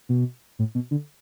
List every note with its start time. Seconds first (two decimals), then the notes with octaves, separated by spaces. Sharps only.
0.09 B2
0.59 A2
0.75 B2
0.91 D3